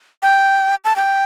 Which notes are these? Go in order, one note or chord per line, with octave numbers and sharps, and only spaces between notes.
G5
A5
G5